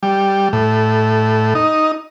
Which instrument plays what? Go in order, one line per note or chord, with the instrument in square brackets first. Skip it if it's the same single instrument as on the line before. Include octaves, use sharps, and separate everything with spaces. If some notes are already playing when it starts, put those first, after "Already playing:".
[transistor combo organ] G3
A2
D#4